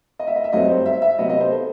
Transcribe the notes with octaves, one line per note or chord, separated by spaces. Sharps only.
D#5
E5
D#5
E5
G2 F#3 A3 C4 D#5
C5
E5
E5
C3 F#3 B3 D#5
D#5
C5
A4